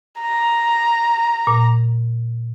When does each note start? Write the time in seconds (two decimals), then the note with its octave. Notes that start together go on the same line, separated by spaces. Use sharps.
0.20 A#5
1.47 A#2